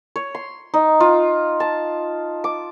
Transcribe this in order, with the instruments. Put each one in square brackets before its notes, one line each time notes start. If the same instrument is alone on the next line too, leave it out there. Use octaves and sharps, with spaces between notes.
[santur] C#5
C6
D#4
F4
A5
D6